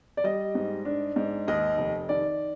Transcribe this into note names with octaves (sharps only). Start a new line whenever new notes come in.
D5
G3 D#5
G#2
D4
G#2
D#2 D#5
F1
D#3 D5